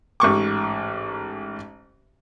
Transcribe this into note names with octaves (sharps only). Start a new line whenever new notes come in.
A1 G#2 C#6 D6